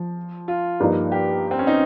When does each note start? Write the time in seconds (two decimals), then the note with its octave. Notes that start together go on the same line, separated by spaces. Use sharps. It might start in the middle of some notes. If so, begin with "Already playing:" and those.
Already playing: F3
0.48 F4
0.80 G2 F3 A#3 D#4
1.12 G4
1.51 C4
1.59 C#4
1.67 D#4